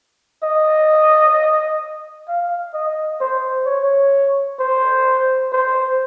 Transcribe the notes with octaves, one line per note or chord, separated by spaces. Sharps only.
D#5
F5
D#5
C5
C#5
C5
C5